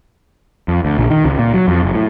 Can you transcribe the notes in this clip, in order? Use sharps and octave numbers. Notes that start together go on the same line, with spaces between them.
F2
D2
A#1
D#3
C#2
A#2
F#3
F2
F#1
A2